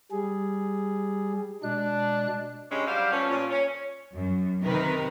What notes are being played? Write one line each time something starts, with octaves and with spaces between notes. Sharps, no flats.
G3 G#4
B2 G#3 D4 F#6
G2 G3 G#3 C#4
F#3 G3 D4 C5 D5 F5
F3 A3 B3 C#4
A#2 C#4
C#4
F#2
C3 D#3 A#4 B4